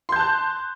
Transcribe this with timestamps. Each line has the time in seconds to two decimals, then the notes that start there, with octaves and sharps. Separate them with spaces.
0.09 C6
0.12 G6
0.16 A5
0.19 F#6